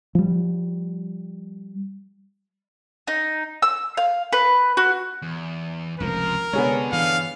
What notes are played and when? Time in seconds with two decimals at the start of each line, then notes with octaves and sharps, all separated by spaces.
0.15 F3 G3
3.07 D#4
3.62 E6
3.97 F5
4.33 B4
4.77 F#4
5.22 E2
6.00 F1 C#2 G#2 F3 A#4
6.53 C3 G#3 B3 D4 G#4 A4 C#5
6.92 G2 E3 F5